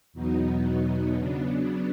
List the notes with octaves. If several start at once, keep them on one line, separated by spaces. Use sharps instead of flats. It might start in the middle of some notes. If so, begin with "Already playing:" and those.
E2 B2 F#3 B3 D#4
C#3 F#3 B3 D4